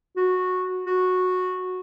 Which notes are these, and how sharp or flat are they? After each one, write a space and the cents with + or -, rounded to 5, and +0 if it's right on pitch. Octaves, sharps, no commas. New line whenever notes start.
F#4 -10
F#4 -10